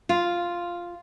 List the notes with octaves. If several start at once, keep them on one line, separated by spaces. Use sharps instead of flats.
F4